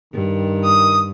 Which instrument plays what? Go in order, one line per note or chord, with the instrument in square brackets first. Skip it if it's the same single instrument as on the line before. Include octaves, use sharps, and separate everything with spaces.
[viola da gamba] G2 [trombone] D#3
[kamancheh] D#6